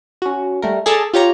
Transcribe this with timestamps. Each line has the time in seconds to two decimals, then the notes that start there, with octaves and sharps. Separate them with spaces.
0.22 C#4 F#4
0.62 G3 A3 A#4
0.86 G#4 A4 D5 A5 A#5
1.14 F4 G4 C#5 A#5